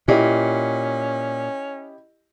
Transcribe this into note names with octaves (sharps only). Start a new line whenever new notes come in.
A#2 C#4 E4 G4 D#5